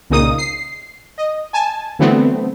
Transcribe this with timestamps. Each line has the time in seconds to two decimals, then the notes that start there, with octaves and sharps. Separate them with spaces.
0.10 C2 A#2 C#3 A#3 D#4 D#6
0.38 C7
1.18 D#5
1.53 G#5 A5
1.99 D3 E3 F#3 A3 B3 C4